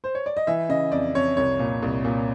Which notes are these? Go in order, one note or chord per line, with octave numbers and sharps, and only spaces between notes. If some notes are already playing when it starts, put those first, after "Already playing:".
C5
C#5
D5
D#5
E3 E5
C#3 D#5
F2 D5
F2 C#5
C2 C#5
A#2
C2
A#2